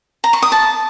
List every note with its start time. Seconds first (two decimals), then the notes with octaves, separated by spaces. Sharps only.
0.24 A#5
0.33 C#6
0.42 D#6
0.52 A5